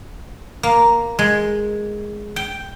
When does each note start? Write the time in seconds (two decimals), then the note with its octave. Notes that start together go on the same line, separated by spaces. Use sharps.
0.63 A#3
1.19 G#3
2.36 G5